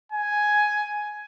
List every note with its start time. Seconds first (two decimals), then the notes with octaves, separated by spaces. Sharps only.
0.12 G#5